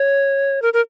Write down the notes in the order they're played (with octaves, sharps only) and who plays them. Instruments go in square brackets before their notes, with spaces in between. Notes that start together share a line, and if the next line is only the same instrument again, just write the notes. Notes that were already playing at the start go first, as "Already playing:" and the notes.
Already playing: [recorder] C#5
A#4
A#4